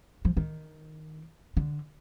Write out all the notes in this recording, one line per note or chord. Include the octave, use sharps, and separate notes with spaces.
F3
D#3
D3